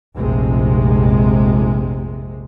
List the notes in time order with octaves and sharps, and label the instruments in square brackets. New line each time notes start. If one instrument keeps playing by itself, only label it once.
[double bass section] F1 A#1 C3 G#3